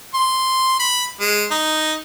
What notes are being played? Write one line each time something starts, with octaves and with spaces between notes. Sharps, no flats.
C6
B5
G#3
D#4